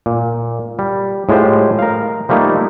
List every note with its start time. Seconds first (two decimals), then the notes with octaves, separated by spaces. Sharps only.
0.06 A#2
0.79 G3
1.29 A2 G#3 F4 G4 C5
1.79 A#4 F5
2.29 F3 G3 A3 A#3 D#4